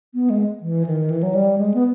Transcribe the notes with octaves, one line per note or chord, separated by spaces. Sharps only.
B3
G#3
E3
D#3
E3
F#3
G3
G#3
B3